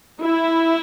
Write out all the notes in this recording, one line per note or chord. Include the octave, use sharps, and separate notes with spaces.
E4